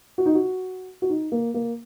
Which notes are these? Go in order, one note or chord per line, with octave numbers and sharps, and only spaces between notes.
F#4
D#4
F#4
F#4
D#4
A#3
A#3